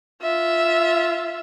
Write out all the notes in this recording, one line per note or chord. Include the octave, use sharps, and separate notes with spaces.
F4 E5